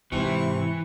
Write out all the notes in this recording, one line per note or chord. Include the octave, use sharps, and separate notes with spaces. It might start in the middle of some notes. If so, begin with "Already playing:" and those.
G#2 C3 E3 C#6